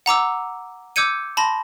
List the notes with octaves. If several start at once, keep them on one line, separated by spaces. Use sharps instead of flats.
F#5 A#5 D6 E6
D6 E6 G6 G#6 C#7 D#7
A5 B5 C6 A#6